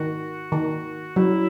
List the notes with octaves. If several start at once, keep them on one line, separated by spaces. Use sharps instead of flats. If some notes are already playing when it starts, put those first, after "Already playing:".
Already playing: D#3 F#4
D#3
F#3 E4